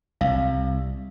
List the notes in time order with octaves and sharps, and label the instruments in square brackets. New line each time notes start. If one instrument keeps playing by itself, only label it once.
[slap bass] C2 [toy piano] F5